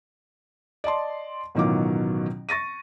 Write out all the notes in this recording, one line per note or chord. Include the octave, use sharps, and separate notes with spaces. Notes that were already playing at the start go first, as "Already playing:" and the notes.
D5 D#5 A5 C6
A1 B2 D#3 F#3 F4 D6
C#6 A6 A#6 D#7